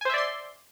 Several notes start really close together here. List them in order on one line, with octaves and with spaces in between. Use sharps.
G#5 C5 E5 D5 C6